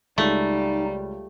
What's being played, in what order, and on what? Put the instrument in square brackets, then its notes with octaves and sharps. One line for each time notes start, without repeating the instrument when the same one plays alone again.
[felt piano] C#2 [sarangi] G3 [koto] A3 [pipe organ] D#4